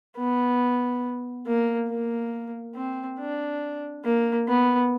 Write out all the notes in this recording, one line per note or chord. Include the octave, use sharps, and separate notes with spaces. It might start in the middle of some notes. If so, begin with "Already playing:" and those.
B3
A#3
A#3
C4
D4
A#3
B3